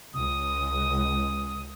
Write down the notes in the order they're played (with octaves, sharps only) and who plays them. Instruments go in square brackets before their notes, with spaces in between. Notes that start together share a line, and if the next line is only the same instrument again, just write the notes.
[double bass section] C#2 [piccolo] D#6